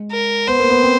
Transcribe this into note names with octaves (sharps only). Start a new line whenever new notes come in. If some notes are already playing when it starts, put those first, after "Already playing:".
Already playing: G#3
A#4
B3 C5
A#3
B3
C4